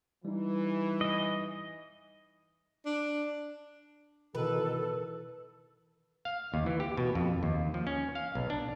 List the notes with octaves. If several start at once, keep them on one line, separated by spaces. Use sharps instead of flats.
E3 G3 D#4
D#5
D4
B2 D#3 E3 A4 B4
F5
D#2
E3
G4
B2
F2
D#2
F3
C#4
F5
B1
D4